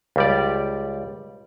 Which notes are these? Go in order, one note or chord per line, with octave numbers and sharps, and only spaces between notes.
C#2 G3 D5